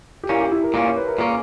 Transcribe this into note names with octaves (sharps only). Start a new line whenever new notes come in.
G4
A#2 A#3 C#4 E4
G4
E4
A#4
A#2 A#3 C#4
C#5
B4
A#4
A#2 A#3 C#4 G#4